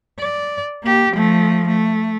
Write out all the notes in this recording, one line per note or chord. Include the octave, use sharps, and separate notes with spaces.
D5
A#3 G4
F3 A3
A3